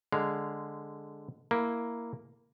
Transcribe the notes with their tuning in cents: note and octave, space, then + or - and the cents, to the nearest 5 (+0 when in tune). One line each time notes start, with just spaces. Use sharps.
D3 +0 G#3 -5 F5 +0
A#3 +0 E4 +0